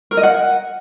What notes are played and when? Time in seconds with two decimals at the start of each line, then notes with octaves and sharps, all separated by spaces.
0.11 A#4
0.17 D#5
0.23 F#5